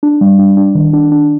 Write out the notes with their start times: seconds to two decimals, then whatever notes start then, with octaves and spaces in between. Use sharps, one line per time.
0.03 D4
0.21 G3
0.39 D4
0.57 D4
0.75 D#3
0.93 D4
1.12 D4